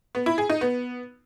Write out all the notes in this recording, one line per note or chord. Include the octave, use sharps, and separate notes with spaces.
B3
E4
G#4
D#4
B3